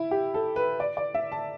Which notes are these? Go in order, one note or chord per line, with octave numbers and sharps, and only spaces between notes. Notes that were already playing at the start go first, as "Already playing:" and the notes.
Already playing: E4
G4
A4
B4
D5
D5
E5
A5